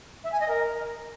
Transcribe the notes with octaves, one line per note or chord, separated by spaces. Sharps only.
E5
G#5
D#5
A#4